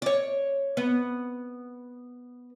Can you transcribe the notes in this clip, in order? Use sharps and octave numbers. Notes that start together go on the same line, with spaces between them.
C#5 D5
B3